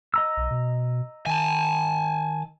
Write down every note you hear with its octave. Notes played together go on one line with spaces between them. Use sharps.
D#5 A#5 E6
B1
B2
D#3 G#5 A5